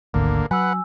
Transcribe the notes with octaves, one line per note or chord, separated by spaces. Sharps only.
G#1 D2 D3 A#3
F#3 B4 F#5 G#5 E6